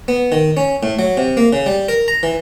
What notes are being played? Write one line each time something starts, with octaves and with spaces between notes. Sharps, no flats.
B3
D#3
C#4
A2
F#3
C3
A#3
C#3
G3
A#4
A#5
E3